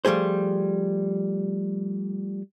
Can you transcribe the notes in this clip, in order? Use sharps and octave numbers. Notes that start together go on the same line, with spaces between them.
F3 G3 A3 G#4 C5